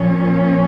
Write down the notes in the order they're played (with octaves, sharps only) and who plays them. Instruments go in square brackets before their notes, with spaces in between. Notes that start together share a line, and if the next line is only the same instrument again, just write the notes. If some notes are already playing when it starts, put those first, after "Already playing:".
Already playing: [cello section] A#2 F3 C#4